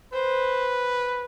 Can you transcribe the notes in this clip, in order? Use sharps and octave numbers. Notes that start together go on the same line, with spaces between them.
B4 C5